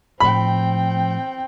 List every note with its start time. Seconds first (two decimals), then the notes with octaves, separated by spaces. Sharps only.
0.20 A2 F3 C4 G5 B5